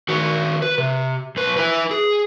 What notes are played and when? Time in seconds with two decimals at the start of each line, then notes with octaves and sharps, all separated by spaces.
0.09 D#3 F#4
0.62 B4
0.78 C3
1.36 B1 B4
1.57 E4 B4
1.91 G#4